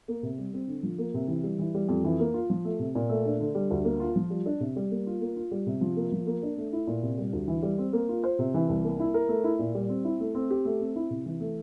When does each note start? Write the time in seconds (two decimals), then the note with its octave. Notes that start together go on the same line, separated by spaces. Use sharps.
0.08 A#3
0.23 C3
0.38 G3
0.54 C4
0.68 D3
0.83 F3
0.98 A#3
1.14 C3
1.28 E3
1.43 G3
1.59 E3
1.74 G3
1.89 F2
2.04 E3
2.20 A#3
2.34 F4
2.50 F3
2.65 A3
2.79 C3
2.95 A#2
3.09 A3
3.25 D4
3.40 D3
3.55 G3
3.71 D2
3.85 A#3
4.00 F4
4.16 F3
4.30 G3
4.46 D4
4.60 C3
4.76 G3
4.91 A#3
5.07 F4
5.21 A#3
5.36 F4
5.51 G3
5.67 C3
5.81 F3
5.97 A#3
6.12 F3
6.27 A#3
6.43 D4
6.58 A3
6.73 E4
6.87 A#2
7.03 C3
7.18 G3
7.33 D2
7.48 E3
7.63 G3
7.78 C4
7.93 A#3
8.09 F4
8.24 C5
8.39 C3
8.54 E3
8.69 C2
8.84 A#3
9.00 E4
9.14 A#4
9.29 A3
9.44 E4
9.59 A#2
9.75 G3
9.89 C4
10.05 E4
10.20 A3
10.35 C4
10.51 G4
10.65 A3
10.80 C4
10.96 E4
11.10 C3
11.26 E3
11.40 A3